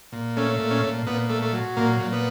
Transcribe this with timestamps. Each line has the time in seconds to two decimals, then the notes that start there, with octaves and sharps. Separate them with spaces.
0.12 A#2
0.37 A3 C#4
0.59 A#2
0.71 C#4
0.84 A#2
1.06 A#2 B3
1.29 A3
1.42 A3
1.53 F#3
1.77 A#2 A#3
2.00 A#2
2.13 B3